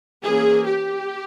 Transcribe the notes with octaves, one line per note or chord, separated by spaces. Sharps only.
E3 A#3 C#4 G#4
G4